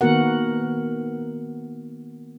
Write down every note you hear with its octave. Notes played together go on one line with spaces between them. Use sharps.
D#3 A#3 B3 F#4 A#4 F#5